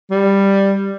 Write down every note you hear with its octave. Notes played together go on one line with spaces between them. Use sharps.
G3